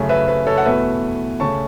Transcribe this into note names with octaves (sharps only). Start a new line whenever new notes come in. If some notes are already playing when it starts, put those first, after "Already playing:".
Already playing: F#2 C#3 A3
B4 E5
B4
A4 C#5
F#5
E2 B2 A3 B4 E5
C#3 A3 C#4 A5 C#6